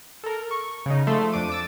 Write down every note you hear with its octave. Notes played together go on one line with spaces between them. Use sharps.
A4 A#4
C#6
C#3 D#4
F3 A3 C6
F2 D4 D6 D#7
D6 E6 A6